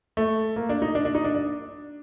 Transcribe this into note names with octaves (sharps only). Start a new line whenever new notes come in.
A3
A#3
D4
D#4
D4
D4
D#4
D4
D4